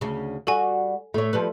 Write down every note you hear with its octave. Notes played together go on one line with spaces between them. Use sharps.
D2 C#3
G3 F#4 A4 G#5
A2 A3 C#5
F3 G3 B4